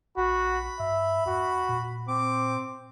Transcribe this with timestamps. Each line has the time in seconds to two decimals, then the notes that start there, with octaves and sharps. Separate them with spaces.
0.17 A#1 F#4 B5
0.79 G2 E5
1.26 E2 F#4
1.69 A#2
2.08 C4 D6